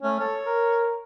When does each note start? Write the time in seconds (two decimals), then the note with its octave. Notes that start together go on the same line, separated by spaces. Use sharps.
0.03 A3 C#4
0.20 A4 C#5
0.46 A#4